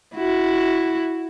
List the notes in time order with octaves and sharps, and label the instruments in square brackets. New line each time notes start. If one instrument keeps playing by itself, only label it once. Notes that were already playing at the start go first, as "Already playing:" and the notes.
[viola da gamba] E4 F#4